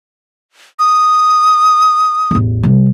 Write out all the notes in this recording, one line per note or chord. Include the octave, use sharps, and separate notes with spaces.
D#6
A1 E2
C3 G3